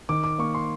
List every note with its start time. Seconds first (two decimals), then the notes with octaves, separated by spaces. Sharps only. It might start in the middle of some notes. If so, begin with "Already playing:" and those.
0.09 D#3 D6
0.24 D6
0.39 A#3 C#6
0.55 C6